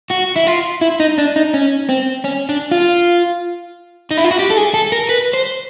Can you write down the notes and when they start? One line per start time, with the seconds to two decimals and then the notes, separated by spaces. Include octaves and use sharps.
0.10 F#4
0.36 E4
0.47 F4
0.81 E4
1.00 D#4
1.18 D4
1.36 D#4
1.54 C#4
1.89 C4
2.24 C#4
2.49 D4
2.71 F4
4.11 D#4
4.17 E4
4.24 F4
4.31 F#4
4.39 G4
4.50 A4
4.57 G#4
4.74 A4
4.92 A#4
5.09 B4
5.34 C5